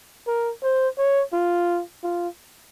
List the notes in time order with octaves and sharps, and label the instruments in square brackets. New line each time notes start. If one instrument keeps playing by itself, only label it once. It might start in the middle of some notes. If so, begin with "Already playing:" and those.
[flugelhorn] A#4
C5
C#5
F4
F4